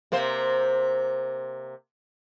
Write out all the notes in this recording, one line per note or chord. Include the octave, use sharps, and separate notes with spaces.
C3 A#3 C5